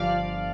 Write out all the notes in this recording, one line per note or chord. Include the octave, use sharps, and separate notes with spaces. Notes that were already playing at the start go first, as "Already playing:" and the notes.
Already playing: G1 G2 F3 D5 F5